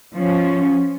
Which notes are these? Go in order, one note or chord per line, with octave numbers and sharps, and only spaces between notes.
F3 C#4